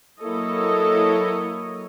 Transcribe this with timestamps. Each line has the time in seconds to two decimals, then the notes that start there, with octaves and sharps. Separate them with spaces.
0.21 F#3 A#3 E4 A4 C#5 D#5